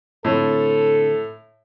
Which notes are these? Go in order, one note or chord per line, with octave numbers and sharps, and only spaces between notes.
A2 D3 C4 A4